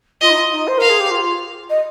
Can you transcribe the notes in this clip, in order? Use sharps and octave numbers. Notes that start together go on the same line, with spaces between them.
F4 D#5
D#4
F4
D#4
C5
A#4 F5
G#4
G4
F4
D#5